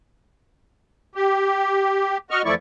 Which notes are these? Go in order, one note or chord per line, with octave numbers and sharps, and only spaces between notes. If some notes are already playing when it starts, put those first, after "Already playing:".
G4
F#4 D#5 C#6 F6
E2 F3 A3 E4 D5 C#6